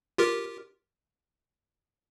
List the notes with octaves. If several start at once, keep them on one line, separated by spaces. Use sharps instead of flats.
F4 G4 A#4